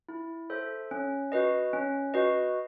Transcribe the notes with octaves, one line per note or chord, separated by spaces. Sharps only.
E4
A4 C5 E5
C#4
F#4 B4 D#5
C#4
F#4 B4 D#5